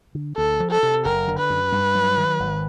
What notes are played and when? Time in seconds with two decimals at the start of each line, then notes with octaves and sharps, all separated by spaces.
0.15 D3
0.37 D2 A4
0.60 F3
0.71 A4
0.83 C3
1.05 F#1 A#4
1.28 D3
1.38 B4
1.50 F#2
1.72 G2
1.95 F#3
2.17 D#3
2.40 G#1